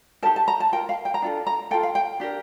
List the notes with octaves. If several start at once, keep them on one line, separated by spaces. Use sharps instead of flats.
D#4 G4 A#4 A5
A5
A#5
A5
F4 A#4 G5
F5
G5
A#5
D4 F4 A4
A#5
F4 A4 G5
F5
G5
D4 G4 A#4